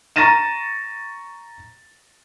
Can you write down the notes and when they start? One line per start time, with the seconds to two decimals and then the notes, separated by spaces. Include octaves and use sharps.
0.16 A#5 C#6 A6 A#6 D#7 E7